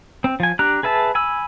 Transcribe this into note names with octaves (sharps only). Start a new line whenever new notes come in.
C4
F3 G#5
D4 G4 A#5 F#6
G#4 B4 E5 A5
G#5 B5 E6